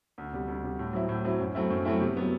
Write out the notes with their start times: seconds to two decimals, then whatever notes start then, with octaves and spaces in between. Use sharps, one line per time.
0.18 D2
0.33 C3 G3
0.48 D2
0.63 C3 G3
0.79 A2
0.93 F#3 C4 E4
1.09 A2
1.25 F#3 C4 E4
1.40 F#2
1.55 F#3 A3 C4 E4
1.70 F#2
1.85 F#3 A3 C4 E4
2.01 C3
2.17 F#3 B3